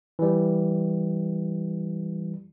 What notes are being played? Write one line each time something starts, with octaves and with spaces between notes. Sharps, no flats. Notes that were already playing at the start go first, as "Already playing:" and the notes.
E3 G3